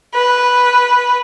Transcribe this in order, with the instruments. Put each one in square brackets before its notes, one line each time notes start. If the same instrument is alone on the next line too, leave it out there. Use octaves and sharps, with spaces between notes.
[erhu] B4